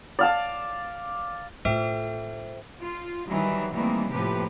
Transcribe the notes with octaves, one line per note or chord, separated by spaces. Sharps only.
D5 F5 A5
A2 F4 A4 C5 E5 G5 C#7
F4
D#3 E3 F#3 G3
D#3 E3 G3 A3 A#3 C4
A2 C3 F3 A#3 G4 B4